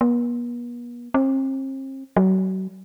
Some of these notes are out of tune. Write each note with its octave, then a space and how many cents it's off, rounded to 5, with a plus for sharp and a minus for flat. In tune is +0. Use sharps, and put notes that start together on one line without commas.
B3 -45
C4 +40
F#3 +35